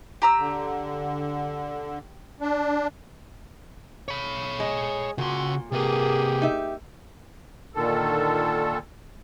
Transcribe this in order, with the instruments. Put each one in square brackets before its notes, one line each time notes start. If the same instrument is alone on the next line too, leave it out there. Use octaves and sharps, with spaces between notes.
[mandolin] G4 A#5 E6
[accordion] D3
D4
[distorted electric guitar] C#5 B5
[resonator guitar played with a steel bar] G#3 [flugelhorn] G#4
[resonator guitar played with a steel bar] A#2 [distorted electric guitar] C#3 C6 [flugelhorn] F#4
[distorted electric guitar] C3 B4 [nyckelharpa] A#3 G#4 [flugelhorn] G4
[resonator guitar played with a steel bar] D#4 E5
[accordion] A#2 D3 D#3 A4